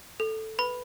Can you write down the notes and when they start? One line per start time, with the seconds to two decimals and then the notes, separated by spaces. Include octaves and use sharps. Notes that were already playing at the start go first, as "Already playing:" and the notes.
0.20 A4
0.59 B4 B5